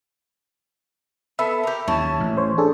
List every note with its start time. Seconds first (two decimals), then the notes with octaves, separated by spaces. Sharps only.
1.39 B3 A4 E5
1.63 G4 A#4
1.88 D#2 C#4 E4 A5
2.20 A1
2.37 C5 C#5
2.58 D4 G#4 A4